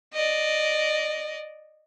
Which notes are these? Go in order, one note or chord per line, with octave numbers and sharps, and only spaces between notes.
D5 D#5